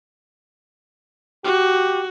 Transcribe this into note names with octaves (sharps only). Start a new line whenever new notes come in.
F#4 G4